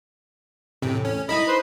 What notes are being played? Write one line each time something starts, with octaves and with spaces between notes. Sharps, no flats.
E2 A2 C3
C#4
D#4 E4 A#4 D#5 B5
B4 C5